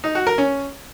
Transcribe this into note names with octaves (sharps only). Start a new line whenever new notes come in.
D#4
F#4
A#4
C#4